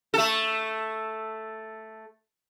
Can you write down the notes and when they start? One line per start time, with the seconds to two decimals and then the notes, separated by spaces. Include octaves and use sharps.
0.14 A3 A4